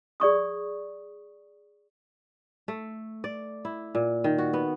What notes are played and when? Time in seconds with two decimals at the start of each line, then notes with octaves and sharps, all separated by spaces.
0.20 G#4 D5 C#6 D#6
2.68 A3
3.24 D5
3.65 E4
3.95 A#2
4.24 D#3
4.38 F#4
4.53 B3